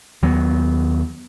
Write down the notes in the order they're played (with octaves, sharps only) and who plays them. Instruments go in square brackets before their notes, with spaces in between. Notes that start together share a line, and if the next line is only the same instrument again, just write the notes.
[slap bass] D#2 F#3 B3